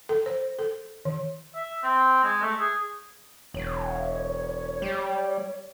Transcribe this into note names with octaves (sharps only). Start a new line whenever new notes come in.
A4
C5
A4
D#3
E5
C4
G#3
A3
G#4
E1 C#5
G3